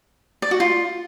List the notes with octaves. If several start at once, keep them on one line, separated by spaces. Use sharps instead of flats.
D5
F#4
F4